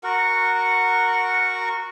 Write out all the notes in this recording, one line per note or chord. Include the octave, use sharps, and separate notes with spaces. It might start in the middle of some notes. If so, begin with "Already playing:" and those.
F#4 A#4 F#5 C#6